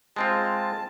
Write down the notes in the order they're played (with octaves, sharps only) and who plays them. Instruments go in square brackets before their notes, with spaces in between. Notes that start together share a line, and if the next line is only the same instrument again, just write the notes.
[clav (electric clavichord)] G#3 C4 F4 [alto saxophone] A5